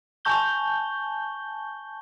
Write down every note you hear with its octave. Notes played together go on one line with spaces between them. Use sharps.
G#5 A5 C#6 G6 G7